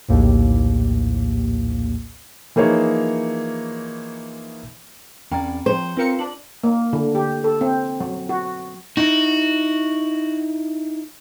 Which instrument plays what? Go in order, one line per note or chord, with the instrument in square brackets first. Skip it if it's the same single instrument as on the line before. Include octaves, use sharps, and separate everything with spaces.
[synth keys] A#1 D#2 A2
[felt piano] E3 F3 A#3 D#4 G#4 C#5
[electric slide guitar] E2 C#4 D5 [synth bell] C4 G5 A#5
[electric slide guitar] F3 C#5 [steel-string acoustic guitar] C5
[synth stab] C4 A#4 C#7 [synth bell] F4 [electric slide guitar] B4 F5
[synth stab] D4 [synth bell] F#7
[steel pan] A#3
D3
G4
A4
C4
F#3
F#4
[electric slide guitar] D#4 E4 [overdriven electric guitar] F#4